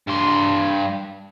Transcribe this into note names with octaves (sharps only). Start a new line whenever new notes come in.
G2 C6